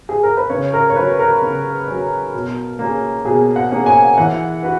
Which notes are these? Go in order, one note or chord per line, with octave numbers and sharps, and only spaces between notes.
G#4
A#4
B4
C#3 C#5
A#4
C#5
F#3 C#4 B4
A#4
C#3
F#3 C#4
B2
A#3 C#4 G#4
B2 G#4
F#5
A#3 C#4 G#4
G#5
E3 F#5
F#4 B4